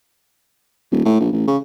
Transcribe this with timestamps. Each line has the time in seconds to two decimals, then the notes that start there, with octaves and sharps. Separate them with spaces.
0.91 D#1
1.05 A2
1.20 A#1
1.32 A1
1.47 C#3